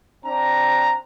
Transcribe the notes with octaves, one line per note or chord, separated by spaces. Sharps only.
C4 D4 A#5